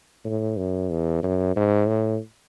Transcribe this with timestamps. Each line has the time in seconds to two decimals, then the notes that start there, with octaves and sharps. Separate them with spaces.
0.25 A2
0.57 F#2
0.90 E2
1.23 F#2
1.56 G#2
1.88 A2